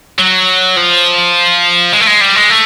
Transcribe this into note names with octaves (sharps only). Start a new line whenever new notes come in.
F#3
F3
G#3
A3
G#3
G3
G#3
A3